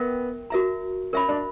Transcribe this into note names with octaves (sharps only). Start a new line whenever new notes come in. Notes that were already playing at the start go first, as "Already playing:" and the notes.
Already playing: B3 A#4 E5 G5
F#4 A#4 E5 A#5
C#4 A#4 E5 B5
D4